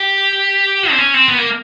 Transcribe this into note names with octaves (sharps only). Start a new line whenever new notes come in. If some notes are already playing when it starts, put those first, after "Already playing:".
Already playing: G4
C4
C#4
C4
B3
A#3